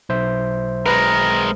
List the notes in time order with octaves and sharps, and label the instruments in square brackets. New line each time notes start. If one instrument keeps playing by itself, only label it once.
[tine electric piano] B1 C5 E5
[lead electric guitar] G#3 A#4 [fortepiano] B4 [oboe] A#5